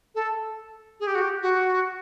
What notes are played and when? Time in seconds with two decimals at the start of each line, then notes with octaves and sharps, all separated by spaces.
0.15 A4
1.00 G#4
1.07 G4
1.15 F#4
1.21 G4
1.42 F#4